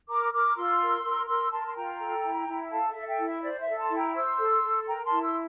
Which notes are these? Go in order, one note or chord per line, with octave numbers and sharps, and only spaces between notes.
A#4 A#5 D6
A#4 D6 F6
F4 C6 E6
A#4
A#4
A#4 C6 E6
A#4 A5 C6
C6
F4 G5 A#5
A4
E4
E4
A4 F5 A5
E5
A4
E5 G5
E4
E5
C5 D5
E5
A4
A5 C6
E4
G5 A#5
C5 C6 E6
A4
A4
A#4 G5 A#5
A5 C6
E4
C6 E6